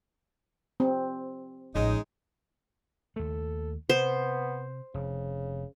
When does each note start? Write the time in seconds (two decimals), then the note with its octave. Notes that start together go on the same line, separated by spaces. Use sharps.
0.80 C4
1.75 A1 F3 G#3 C#4 D#4
3.16 D#2 A3 A4
3.90 C3 B3 C5
4.94 F1 C#3